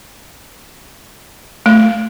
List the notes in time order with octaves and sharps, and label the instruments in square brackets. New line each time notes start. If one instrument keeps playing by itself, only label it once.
[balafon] A3